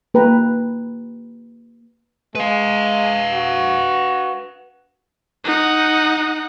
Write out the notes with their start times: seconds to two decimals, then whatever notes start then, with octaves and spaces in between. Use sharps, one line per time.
0.14 A#3 B4 G5 A#5
2.35 G#3 B4 F5
3.32 F#4
5.44 D#4 F#5